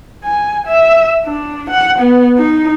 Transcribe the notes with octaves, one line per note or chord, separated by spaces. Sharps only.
G#5
E5
D4
F#5
B3
D#4